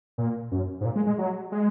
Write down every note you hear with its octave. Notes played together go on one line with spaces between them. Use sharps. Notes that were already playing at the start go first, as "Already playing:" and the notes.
A#2
F#2
G#2
A#2
G#3
G#3
F#3
G#3